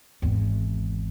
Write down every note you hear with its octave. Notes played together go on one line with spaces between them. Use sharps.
G#1 E2